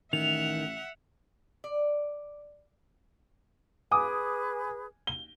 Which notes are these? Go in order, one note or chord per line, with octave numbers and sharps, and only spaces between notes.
A1 D#3 E5 F#5 F7
D5
G#4 B4 G#5 D6 D#6
G7